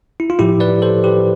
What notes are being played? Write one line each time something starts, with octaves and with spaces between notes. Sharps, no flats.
E4
F4
A2 F3 E4 G4
B4 D5
A4 C5
G4 B4